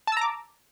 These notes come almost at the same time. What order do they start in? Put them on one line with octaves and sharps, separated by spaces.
A5 E6 A#5 D6